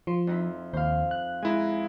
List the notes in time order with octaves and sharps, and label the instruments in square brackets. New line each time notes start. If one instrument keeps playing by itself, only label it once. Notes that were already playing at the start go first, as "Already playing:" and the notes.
[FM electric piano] F3 [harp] C6
[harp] F2 D#4 E4
[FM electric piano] D#2 [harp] C5 F5
[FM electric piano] F#6
[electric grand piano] G#3 E4 [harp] G#5 A#5